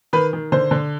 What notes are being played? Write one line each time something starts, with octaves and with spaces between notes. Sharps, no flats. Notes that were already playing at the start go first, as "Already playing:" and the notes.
D#3 B4
D#3
D3 C5
D3